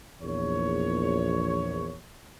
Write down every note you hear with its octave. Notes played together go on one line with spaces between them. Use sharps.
A#1 E2 C#5